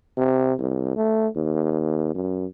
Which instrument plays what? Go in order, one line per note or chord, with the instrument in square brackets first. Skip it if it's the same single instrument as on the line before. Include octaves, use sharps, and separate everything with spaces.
[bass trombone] C3
C2
A3
D#2
F#2